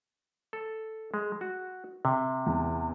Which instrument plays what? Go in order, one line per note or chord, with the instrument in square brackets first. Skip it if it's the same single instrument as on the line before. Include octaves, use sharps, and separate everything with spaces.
[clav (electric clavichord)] A4
G#3
F#4
C3
[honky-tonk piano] E2